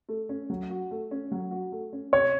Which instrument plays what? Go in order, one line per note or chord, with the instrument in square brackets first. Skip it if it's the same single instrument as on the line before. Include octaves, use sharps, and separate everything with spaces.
[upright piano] A3
C#4
F#3
F#4
A3
C#4
F#3
F#4
A3
C#4
[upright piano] C3 [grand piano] C#5